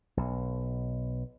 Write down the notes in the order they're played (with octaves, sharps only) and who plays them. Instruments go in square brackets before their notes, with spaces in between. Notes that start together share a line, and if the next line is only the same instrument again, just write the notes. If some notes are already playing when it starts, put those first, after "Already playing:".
[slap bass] B1